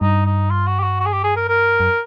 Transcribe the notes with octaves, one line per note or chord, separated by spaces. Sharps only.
G2 D#4
D#4
F4
F#4
G4
F#4
F#4
G#4
G4
G#4
A#4
A#4
F#2